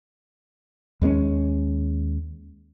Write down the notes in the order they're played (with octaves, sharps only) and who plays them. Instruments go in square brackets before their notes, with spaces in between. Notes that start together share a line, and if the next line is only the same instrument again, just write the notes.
[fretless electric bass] D#2 G#3 A#3 C#4